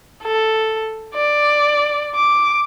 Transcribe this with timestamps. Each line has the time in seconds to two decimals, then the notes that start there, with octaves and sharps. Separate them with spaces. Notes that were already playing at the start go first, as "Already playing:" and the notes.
0.23 A4
1.15 D5
2.15 D6